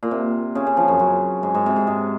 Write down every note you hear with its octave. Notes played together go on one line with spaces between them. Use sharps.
A#2
C3
C#3
C#3
F3
F#2
F#2
G#2
G#2
C3
G#2
G#2